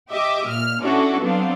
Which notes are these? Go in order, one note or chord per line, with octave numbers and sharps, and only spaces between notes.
G4 D#5 E5 D6
A#2 F6
C#4 D4 E4 F#4 A4 D5
F#3 B3 C4 D4 F5